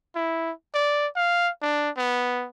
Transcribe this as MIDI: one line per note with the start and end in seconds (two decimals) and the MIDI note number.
0.16 0.51 64
0.75 1.07 74
1.16 1.50 77
1.62 1.90 62
1.97 2.47 59